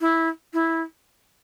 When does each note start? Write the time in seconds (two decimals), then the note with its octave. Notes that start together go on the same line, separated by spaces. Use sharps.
0.01 E4
0.53 E4